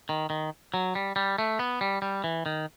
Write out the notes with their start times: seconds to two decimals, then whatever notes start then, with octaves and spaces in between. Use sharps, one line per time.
0.09 D#3
0.30 D#3
0.74 F#3
0.95 G3
1.16 G3
1.38 A3
1.59 B3
1.81 G3
2.02 G3
2.24 E3
2.46 D#3